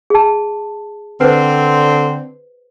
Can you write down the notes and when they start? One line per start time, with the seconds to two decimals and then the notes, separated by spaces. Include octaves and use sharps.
0.10 G#4 A5
1.21 D3 C4 B4 C5